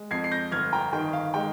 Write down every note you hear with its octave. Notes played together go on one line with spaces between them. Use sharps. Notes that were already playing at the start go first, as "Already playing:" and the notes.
Already playing: G#3
F2 G#6 C7
C7
G6 A#6
G1 F6 G#6
G5 A#5
D#3 G5
F5
G#3 G5